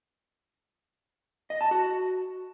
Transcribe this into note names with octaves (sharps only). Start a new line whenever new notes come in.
D#5
A5
F#4